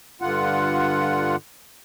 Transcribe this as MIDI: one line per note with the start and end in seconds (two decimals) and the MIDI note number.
0.22 1.36 43
0.22 1.36 50
0.22 1.36 65
0.22 1.36 78